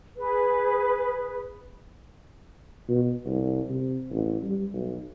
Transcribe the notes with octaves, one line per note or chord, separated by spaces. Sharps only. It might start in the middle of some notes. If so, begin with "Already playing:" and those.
G#4 B4
B2
C2
C3
A1
G3
B1